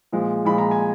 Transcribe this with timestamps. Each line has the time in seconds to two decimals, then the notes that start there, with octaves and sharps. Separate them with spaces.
0.13 A#2 F3 G#3
0.45 A#2 F3 G#3 B5
0.58 A#5
0.71 G#5